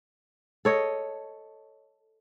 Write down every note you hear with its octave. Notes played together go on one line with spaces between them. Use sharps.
A4 C#5 D#5